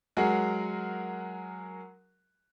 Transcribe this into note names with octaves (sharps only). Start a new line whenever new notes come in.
F#3 G#3 F#4 G#4 A#4 F#5